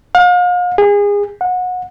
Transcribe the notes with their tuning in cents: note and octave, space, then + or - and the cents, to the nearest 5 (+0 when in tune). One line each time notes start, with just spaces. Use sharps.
F5 +40
G#4 -30
F#5 -25